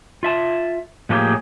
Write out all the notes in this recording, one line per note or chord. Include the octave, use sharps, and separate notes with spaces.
F4 E5 A5
A2 F3 A3 A#3 G4 G#4